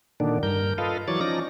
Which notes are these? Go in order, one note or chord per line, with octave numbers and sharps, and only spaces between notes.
A#2 D3 D#3 D4
G2 A#4 G6
F4 A4 B4 D#5 F5
E3 F#3 C#5 D5 A6
F3 C#4 D#4 D5 A#6